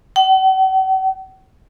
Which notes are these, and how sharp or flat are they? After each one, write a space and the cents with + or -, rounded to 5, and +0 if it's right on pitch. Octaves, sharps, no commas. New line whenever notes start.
F#5 +45